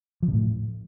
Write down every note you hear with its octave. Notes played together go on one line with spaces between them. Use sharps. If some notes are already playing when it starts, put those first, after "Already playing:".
F3
C3
A2